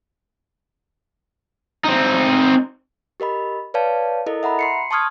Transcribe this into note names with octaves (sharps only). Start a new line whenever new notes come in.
C4 D#4
G4 A#4 D#5 B5
B4 C#5 D5 F5 A5
E4 A4 A#4 D#5
E5 F#5 A#5 B5
C6 C7 C#7
A5 C6 C#6 D#6 F6 G#6